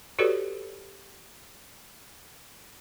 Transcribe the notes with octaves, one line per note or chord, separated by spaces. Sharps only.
F#4 G4 A4 B4 C#5 D5